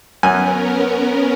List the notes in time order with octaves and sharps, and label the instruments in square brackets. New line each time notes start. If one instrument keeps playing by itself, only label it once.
[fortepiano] F#2 G#5 [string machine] B3 C#4 A#4